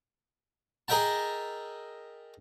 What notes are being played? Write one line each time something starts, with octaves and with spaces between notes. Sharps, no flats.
G#4 A#4 D#5 E5 G5 A5